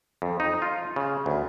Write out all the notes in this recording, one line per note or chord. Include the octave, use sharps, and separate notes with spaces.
F2
D#4
F4
C#3
D2